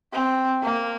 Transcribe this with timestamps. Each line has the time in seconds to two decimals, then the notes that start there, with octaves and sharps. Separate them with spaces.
0.13 C4
0.63 A#3